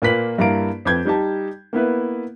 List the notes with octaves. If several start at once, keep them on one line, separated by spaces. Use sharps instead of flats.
A#2 A#3 B4 B6 F#7
G2 A#3 E4 F5 A#5 D7
F2 B4 G6 G#6
G3 D#4 G4 A5
A#3 B3 E4 B4